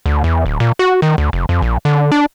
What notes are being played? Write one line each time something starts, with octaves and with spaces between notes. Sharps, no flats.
D2
E2
D1
A#2
F#4
D#3
D2
F1
F2
A#1
D3
D4